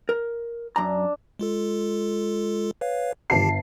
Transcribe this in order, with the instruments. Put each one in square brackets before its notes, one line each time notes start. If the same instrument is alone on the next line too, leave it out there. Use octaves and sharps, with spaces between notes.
[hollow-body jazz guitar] A#4
[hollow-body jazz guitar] F#2 A#5 [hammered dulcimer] D4
[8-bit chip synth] G#3 F4 A4
B4 C#5 F5
[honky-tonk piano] G1 A5 C7 [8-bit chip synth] D#3 G4